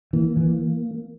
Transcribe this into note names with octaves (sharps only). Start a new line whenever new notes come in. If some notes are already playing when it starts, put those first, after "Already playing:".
E3 A#3
E3